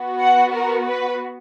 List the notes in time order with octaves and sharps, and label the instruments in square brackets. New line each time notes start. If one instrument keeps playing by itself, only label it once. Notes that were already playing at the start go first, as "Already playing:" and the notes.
Already playing: [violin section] B3 F#4
F#5
A#4
B4